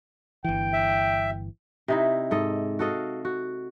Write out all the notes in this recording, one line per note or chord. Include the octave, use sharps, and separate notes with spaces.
G1 E3 G5
E5
C3 D#4 E4
G#2 A4 D#5
F#4 A4 D#5 F5
F#4